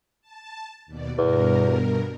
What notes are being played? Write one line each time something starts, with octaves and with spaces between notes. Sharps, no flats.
A5
D#2 B2 D5
E2 G2 B2 A#4